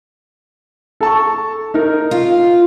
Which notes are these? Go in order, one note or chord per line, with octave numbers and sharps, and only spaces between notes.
A4 A5 C#6
D#4 A#4
F4